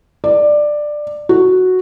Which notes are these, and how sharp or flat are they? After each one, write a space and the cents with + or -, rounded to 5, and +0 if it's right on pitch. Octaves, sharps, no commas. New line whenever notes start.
D5 +15
F#4 -5